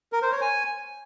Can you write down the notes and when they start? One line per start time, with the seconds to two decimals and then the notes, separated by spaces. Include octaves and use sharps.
0.13 A#4
0.22 C5
0.32 C#5
0.41 G#5